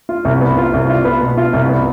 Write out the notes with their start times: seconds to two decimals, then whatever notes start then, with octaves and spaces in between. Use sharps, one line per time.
0.09 F4
0.25 C2
0.41 B3
0.58 F4
0.73 C2
0.90 F4
1.05 B3
1.22 B2
1.37 F4
1.53 C2
1.69 B3